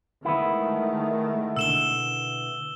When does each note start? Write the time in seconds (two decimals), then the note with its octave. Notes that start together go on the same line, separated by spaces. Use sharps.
0.25 D#3 G#3 A3 B3 E4
1.56 B2 D3 E6 E7 G7